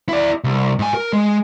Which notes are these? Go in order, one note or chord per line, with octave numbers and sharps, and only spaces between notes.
E4 D5
C2
G#2 G#5
A#4
G#3